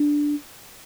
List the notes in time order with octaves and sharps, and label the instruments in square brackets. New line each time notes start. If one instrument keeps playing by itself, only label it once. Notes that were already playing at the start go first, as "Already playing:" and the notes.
Already playing: [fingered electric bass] D4